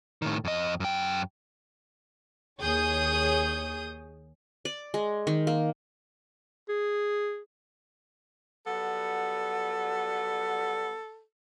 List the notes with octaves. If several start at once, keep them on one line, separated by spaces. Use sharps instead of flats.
A2 D#3
F2 D#5
F#2 G5
D#2 G#4 C#5 D#6 G6
D5
G#3
D#3
A#3
G#4
F#3 G3 B3 A4